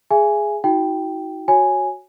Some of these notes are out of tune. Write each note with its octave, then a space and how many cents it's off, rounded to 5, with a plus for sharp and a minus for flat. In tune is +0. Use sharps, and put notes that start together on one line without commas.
G#4 +0 E5 +35 G#5 +0
D#4 +40 F#4 +0 G5 -5
F#4 +0 C#5 +0 G#5 +0